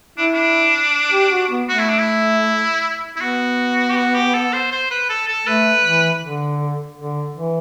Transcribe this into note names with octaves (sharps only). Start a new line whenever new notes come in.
D4 E4
D4
G4
F#4
B3
A3 F#4
E4
D4
E4
E4
B3 F#4
G4
F#4
G4
A4
C5
C5
B4
A4
A4
A3 B4
E3
D3
D3
E3